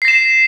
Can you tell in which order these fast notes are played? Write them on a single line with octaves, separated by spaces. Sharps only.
C7 A#6 E7